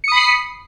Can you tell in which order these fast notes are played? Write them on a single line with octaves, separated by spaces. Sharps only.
C#7 D#6 B5 C7